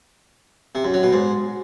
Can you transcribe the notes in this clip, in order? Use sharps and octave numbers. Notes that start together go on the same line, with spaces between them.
C3
F#2
F#3
B2
G#2